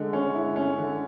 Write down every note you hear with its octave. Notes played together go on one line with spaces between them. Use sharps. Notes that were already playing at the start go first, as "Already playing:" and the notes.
Already playing: D3 G#3
C#4
E4
C#4
D3